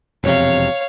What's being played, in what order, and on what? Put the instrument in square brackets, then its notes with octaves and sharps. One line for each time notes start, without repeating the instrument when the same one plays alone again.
[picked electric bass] E1 F2 C3 [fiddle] C#5 F5